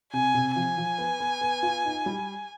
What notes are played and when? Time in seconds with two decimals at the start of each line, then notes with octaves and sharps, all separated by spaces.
0.13 C3 G#5
0.35 C3
0.56 F3 G#5
0.78 F3
0.98 B3
1.20 B3
1.41 B3
1.63 F4
1.85 D#4
2.06 G3